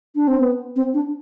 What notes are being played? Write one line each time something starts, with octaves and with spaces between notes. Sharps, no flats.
D4
C4
B3
C4
D4